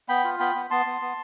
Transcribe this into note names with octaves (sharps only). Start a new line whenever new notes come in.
B3 G5 B5
F4
B3 G5 B5
B3
B3 A5 C6
B3
B3